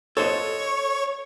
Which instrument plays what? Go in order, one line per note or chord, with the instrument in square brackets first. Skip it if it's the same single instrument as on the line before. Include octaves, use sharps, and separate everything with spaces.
[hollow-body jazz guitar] A4 C5 D#5 [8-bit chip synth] C#5 C#6